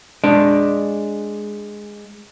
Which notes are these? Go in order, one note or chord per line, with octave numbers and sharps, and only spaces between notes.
G#3 D4 D5